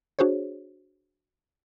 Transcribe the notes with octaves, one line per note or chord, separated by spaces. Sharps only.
D4 F#4 G#4 C5 C#5